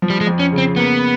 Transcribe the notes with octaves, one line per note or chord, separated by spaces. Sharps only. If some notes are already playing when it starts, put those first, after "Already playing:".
F3
G3
G#3
F2
C#4
C#3
C4
A#3 B3